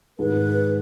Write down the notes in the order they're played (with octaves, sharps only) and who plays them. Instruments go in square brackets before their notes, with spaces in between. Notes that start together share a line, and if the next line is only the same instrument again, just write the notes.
[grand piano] G#2 D#3 G#3 [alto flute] B4